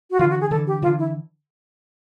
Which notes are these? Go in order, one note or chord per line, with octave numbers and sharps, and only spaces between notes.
F#4
D3 E3 F4
F#4
G#4
D3 E3 A4
G4
D3 E3 F4
E4